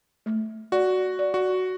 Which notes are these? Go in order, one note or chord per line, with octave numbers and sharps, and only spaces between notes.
A3
F#4 D5
D5
F#4